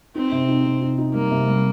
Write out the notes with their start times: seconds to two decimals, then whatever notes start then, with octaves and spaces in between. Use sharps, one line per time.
0.15 C4 D#4
0.32 C3
0.48 D#4
0.65 C3
0.81 D#4
0.98 D#4
1.14 G3 A#3
1.31 C3
1.48 G3